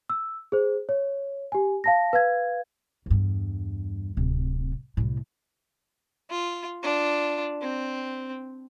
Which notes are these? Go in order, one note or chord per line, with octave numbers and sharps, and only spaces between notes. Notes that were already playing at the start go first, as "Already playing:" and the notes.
E6
G#4 C5
C#5
G4 G#5
F5 A5 A#6
B4 F5 G#6
E2 G2
D1 C3
C2 A2
F4
D4 F4
C4